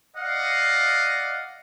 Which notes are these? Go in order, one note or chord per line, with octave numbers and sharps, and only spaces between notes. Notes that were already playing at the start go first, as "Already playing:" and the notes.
D5 D#5 F5 F#5